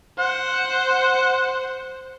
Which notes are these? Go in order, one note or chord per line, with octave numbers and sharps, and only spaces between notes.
C5 F#5